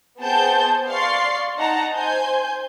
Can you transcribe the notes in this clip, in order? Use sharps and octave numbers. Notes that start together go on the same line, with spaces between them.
B3 G#4 C5 G5 A5 G6
D5 F5 C6 C#6 A6 C7
D#4 F#5 A5 A#5
C5 G#5 G6